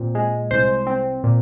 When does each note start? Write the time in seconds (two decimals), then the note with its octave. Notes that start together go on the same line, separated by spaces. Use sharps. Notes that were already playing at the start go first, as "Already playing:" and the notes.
Already playing: A#2 C4
0.15 G#3
0.51 C2 C5
0.87 C4
1.24 A#2